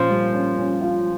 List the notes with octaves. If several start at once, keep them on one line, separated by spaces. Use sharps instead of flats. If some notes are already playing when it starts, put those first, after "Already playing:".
Already playing: A#2 F3 C#4
G3
C#4
C#4
F4